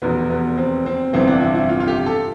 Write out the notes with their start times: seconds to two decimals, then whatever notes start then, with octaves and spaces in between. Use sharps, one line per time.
0.02 F1 E2 B2 B3
0.30 B3
0.58 C4
0.86 C4
1.13 G1 F2 C3 E3 C4
1.28 D4
1.41 E4
1.55 E4
1.69 F4
1.80 F4
1.88 G4
2.06 A4